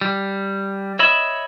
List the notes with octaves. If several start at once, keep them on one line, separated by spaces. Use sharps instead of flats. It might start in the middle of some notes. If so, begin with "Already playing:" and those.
G3
C#5 D#5 E5 B5